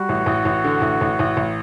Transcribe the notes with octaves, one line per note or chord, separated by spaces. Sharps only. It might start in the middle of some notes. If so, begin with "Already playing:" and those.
Already playing: G3 F#4
A1
A1
A1
D3
A1
A1
A1
A1